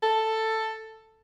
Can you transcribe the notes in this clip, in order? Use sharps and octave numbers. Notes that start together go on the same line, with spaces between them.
A4